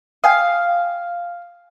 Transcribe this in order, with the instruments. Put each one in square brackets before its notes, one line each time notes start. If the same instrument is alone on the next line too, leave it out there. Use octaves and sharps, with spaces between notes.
[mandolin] F5 [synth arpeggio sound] G5 G#5 D#6